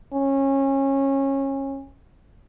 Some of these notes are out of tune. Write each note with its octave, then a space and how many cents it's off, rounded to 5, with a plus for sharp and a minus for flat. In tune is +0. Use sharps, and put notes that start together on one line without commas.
C#4 -25